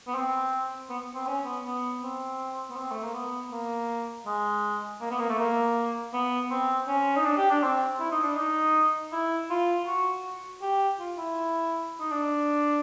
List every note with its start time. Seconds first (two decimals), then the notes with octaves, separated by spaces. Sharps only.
0.07 B3
0.15 C4
0.89 B3
1.15 C4
1.27 C#4
1.45 B3
1.64 B3
2.02 C4
2.70 B3
2.77 C4
2.91 A3
3.03 A#3
3.14 B3
3.51 A#3
4.26 G#3
5.01 A#3
5.11 B3
5.19 A#3
5.29 A3
5.39 A#3
6.13 B3
6.51 C4
6.87 C#4
7.16 D#4
7.25 D4
7.37 G4
7.51 D4
7.63 C4
8.00 E4
8.11 D#4
8.23 D4
8.36 D#4
9.12 E4
9.50 F4
9.86 F#4
10.62 G4
10.99 F4
11.17 E4
11.99 D#4
12.11 D4